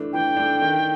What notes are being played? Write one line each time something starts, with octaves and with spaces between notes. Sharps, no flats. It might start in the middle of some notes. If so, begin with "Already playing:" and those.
Already playing: E3 A3 D4
E3 G5
A3 D4
D#3